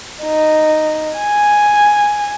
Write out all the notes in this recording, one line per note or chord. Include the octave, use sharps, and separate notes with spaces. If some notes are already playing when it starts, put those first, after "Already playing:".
D#4
G#5